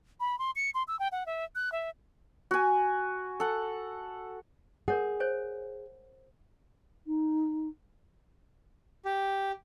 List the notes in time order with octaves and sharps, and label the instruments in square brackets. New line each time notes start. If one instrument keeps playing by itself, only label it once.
[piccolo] B5
C6
C#7
C6
E6
G5
F#5
E5
F#6
E5
[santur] F#4 G#5
A4 F#5
[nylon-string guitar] G#4 [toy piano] A#4 C#5 F#5
[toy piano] C5 C#5 G#5
[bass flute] D#4
[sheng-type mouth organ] G4